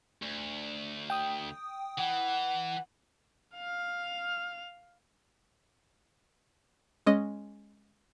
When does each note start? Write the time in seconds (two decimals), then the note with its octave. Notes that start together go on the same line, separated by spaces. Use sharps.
0.22 D2
1.10 G5 D#6
1.98 E3 F#5
3.56 F5 F6
7.06 G#3 C#4 D#5